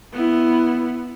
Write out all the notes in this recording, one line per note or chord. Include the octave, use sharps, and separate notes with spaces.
B3 E4